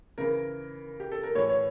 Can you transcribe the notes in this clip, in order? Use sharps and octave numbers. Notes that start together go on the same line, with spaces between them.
C#3 E3 A#4
G4
A4
A#4
A2 E3 C#5
C#5